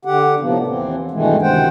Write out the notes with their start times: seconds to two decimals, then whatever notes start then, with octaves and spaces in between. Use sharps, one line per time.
0.05 D3 G4 F#5
0.40 A2 C3 F3 A#3 B3
0.67 D#2 E3 C4
1.11 G2 B2 D#3 E3 G#3 A3
1.42 D2 C3 D#3 C5 F#5 G5